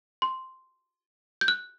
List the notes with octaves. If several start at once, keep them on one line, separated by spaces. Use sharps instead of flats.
C6
G6
F#6